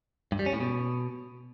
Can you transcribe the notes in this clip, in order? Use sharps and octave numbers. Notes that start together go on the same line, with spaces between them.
G2
G3
C#4
A2
B2